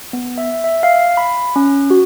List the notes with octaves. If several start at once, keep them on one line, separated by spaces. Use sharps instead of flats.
B3
E5
E5
F5
B5
C#4
F#4